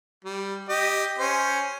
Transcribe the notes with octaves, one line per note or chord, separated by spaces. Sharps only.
G3
G4 D#5
C#4 C5